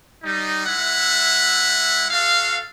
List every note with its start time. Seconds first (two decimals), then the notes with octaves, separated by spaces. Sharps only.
0.23 G3 D#4
0.66 G#3 E4 E5 F#5
2.10 F#4 A4 F5